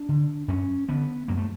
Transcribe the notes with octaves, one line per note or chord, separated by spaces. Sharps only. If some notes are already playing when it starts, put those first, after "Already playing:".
Already playing: D4
D3
F#2 C#4
D3 B3
F#2 A#3
A3